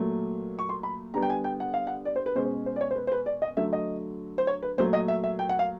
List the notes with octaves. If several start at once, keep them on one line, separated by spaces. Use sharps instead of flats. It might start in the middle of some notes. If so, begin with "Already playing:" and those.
Already playing: A#2 F#3 A3
C#6
C6
B5
D3 G3 B3 A#5
G5
G#5
G5
F#5
F5
F#5
D5
C5
B4
B2 G#3 C#4 C5
C5
C5
D5
C#5
C5
B4
C5
B4
D5
D#5
D3 F#3 A3 E5
D#5
C5
C#5
B4
A#2 F#3 A3 C5
D#5
E5
E5
G5
F#5
F5